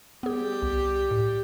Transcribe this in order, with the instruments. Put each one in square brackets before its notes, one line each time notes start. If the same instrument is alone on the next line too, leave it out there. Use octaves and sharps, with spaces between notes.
[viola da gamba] G3 G4 [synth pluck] B3 G#4
[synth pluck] C2
A2